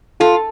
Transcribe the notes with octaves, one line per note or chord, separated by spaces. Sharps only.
F4 A4